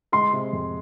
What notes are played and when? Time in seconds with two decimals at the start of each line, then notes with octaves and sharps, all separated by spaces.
0.12 G#3 C6
0.33 C3
0.53 F2